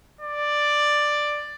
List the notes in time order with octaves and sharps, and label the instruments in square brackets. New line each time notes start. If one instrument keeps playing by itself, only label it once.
[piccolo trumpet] D5